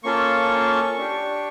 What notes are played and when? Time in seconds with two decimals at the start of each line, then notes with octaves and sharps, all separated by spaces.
0.04 A#3 C#4 F4 A4 C#6
0.98 D4 G4